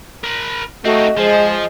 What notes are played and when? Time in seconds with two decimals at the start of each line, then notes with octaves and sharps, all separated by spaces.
0.24 A#4 B5
0.85 A3 C4 D#4 F#4 D#5
1.17 F3 G#3 G#4 C5